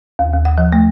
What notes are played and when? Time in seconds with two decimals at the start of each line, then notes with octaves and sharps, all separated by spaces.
0.19 D#2
0.33 D#2
0.45 F#5
0.58 F3
0.72 A3